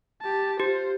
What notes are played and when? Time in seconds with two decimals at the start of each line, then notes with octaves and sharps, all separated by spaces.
0.22 G4 A5
0.60 F4 G4 C5